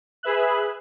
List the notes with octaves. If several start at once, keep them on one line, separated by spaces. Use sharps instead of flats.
G#4 B4 E5 F#6